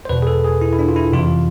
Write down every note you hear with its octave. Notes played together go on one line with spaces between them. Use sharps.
C5
E2 B2 B4
G#4
A4
G#4
E4
E4
D4
F4
E4
F2 C3 E3 F4